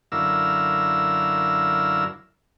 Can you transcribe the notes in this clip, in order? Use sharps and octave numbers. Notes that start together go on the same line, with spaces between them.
F#2 D3 E4 A#4 F5 E6